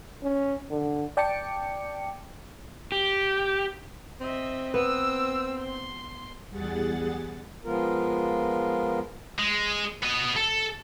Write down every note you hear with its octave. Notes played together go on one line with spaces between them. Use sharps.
C#4
D3
D5 G5 A5 D6 C#7
G4
C4 D#5 E5
B3 B4 E6
C6
E2 G3 G#4 F#5 A6
F3 G#3 B3 F4 A#4
G#3
B3 D#5
A4